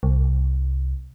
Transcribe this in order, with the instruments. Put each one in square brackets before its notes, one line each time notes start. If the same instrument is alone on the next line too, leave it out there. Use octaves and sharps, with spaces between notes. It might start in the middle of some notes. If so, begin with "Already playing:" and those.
[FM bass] C2